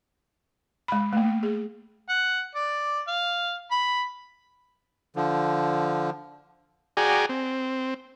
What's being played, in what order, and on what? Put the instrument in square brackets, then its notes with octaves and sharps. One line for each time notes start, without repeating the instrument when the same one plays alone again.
[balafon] G#3 B5
A3 A#3
G#4
[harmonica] F#5
D5
F5
B5
[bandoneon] D3 F3
[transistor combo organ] F#4 G#4 D5 G5 G#5 A#5
C4